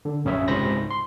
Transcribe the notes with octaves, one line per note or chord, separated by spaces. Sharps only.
D3
A#1 F#2 C#4 G#4 C#5 E5
C#2 G#2 C3 C5 B5 A#6
C6